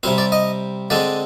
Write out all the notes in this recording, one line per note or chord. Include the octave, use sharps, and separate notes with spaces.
C3 G3 C4 C5
D5
D#5
D3 G#3 C4 D5